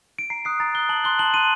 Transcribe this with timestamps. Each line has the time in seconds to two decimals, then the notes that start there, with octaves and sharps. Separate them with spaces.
0.19 D7
0.30 A#5 C7
0.45 D#6 F#6 C7
0.60 A#5 A6
0.75 D#6 F#6 G7
0.89 A5 F#7
1.04 C6 F#6 G7
1.19 A5 F#7
1.34 C6 F#6 D#7